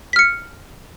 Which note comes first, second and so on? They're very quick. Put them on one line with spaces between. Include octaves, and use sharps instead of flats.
B6 F6 C#7